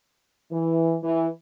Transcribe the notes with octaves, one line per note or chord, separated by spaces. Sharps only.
E3
E3